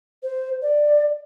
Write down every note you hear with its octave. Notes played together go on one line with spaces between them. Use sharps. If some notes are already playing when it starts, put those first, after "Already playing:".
C5
D5